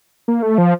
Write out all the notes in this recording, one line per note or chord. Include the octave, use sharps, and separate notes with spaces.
A#3
A3
F3